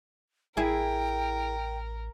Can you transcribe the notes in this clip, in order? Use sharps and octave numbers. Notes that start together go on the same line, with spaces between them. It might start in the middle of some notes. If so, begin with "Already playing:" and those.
A1 E4 G#4 A#4 G5